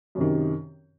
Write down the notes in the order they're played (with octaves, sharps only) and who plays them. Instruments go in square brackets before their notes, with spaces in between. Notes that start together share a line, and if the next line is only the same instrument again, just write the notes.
[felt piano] F#2
C3
D#3